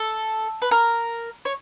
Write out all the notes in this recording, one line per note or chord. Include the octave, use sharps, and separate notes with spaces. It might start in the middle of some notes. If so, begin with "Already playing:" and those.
Already playing: A4
B4
A#4
C#5